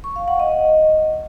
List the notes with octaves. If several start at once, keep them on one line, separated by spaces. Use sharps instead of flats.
C#6
F5
F#5
D#5